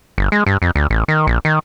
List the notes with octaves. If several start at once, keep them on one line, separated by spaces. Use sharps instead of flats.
G1
G#3
G2
F2
D2
A1
D#3
A#1
D#3